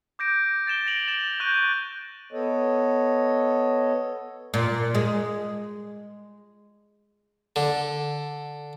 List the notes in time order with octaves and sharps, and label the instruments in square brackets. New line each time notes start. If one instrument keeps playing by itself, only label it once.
[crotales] D6 G6 A#6 D7
A6 D7 E7 G7
A#6 D7 F7 F#7
A6 E7
C#6 F#6 G6 A#6 D#7
[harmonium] B3 A4 C#5 D#5
[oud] A#2
G#3
[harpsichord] D3